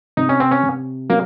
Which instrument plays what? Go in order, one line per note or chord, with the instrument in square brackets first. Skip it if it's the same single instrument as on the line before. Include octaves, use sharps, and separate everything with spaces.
[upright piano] C3 [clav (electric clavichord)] D#4
[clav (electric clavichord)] C#4
C4
C#4
[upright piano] C3
[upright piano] F#3 [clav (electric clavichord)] A#3